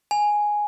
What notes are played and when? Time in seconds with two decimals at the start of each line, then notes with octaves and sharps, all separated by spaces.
0.11 G#5